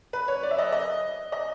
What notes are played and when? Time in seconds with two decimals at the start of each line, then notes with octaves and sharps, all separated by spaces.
0.13 B4
0.28 C#5
0.43 D5
0.51 E5
0.58 D#5
0.72 D#5
1.32 D#5